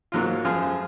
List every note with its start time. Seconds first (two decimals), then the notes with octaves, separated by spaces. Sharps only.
0.12 G#2 F#3 A#3 F4
0.45 F#2 F3 G#3 F4 G#4